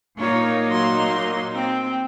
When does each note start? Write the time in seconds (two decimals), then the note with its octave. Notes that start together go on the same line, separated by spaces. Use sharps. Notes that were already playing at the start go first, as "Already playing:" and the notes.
0.19 A#2 A#3 D#4 F4 C#5
0.68 F#3 C6
1.55 C4